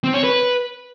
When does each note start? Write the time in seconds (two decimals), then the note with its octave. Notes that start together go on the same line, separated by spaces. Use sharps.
0.04 C4
0.14 C#5
0.24 B4